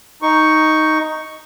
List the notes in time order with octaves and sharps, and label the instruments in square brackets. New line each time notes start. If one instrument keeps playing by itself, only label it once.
[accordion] D#4 C#6